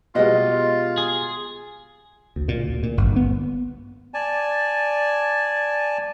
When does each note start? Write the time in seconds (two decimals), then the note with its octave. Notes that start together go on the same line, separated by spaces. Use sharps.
0.15 B2 G3 G#3 F4 B4 D#5
0.98 G#4
2.36 D2
2.48 A#2
2.64 D2
2.83 A#2
2.97 G1
3.16 B3
4.14 D5 G#5 A5